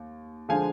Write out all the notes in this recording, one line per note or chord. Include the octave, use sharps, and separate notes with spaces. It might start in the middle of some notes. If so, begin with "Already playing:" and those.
Already playing: D#2
D3 F3 G#3 F5 G#5